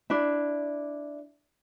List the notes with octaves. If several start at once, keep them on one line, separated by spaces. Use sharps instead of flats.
D4 E4